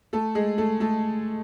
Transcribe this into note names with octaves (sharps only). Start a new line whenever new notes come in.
A3 A4
G#3 G#4
A3 A4
A3 A4